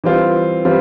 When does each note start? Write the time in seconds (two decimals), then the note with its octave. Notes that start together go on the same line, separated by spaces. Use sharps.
0.04 E3 G3 C4 F4
0.65 E3 G3 C4 F4